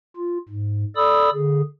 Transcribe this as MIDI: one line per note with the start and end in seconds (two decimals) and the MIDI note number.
0.16 0.38 65
0.49 0.84 44
0.96 1.30 69
0.96 1.30 74
0.96 1.30 83
0.96 1.30 87
0.96 1.30 88
1.33 1.62 50
1.33 1.62 68